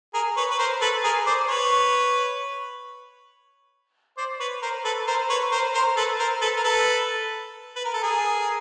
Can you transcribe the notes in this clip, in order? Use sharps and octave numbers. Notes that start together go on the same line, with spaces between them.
G#4 A#4
B4 C#5
B4
A#4 C5
A4 B4
G#4 A#4
C5 D5
B4 C#5
C5 D5
B4 C#5
A#4 C5
A4 B4
A#4 C5
B4 C#5
A#4 C5
A#4 C5
A4 B4
A#4 C5
A4 B4
A#4
A4 B4
B4
A#4
A4
G#4 A#4